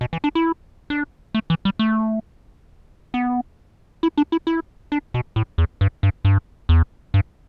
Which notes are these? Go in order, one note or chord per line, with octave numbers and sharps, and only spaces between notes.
B2
E3
D4
E4
D4
A3
E3
G3
A3
B3
E4
D4
E4
E4
D4
B2
A2
E2
G2
G2
G2
E2
G2